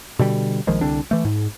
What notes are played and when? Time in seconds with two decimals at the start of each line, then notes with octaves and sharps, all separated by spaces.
0.19 B2 D3 G3
0.67 A#1 D#3 F3 G#3
0.81 C2 D3 C4 D4
1.11 E3 A3
1.25 G#2